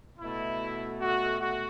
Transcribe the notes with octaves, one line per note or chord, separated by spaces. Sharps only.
B2 A3 E4
F#4
F#4